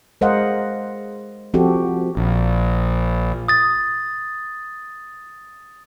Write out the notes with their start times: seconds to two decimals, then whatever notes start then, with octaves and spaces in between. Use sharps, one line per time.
0.21 G#3 A#4 C5 D#5 F5 F#5
1.54 F3 C4 F#4 G4 A4
2.17 A#1
3.48 D#6 A6